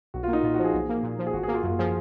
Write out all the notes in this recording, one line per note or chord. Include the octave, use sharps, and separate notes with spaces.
B1 F#4
F4
A#3 D#4
A#2 F4
F#4
F3
G#4
B1
A#3
A#2
F3
G#4
G#1 F#4
G#4
A#3
F4
F#2 G#4
F3 G#4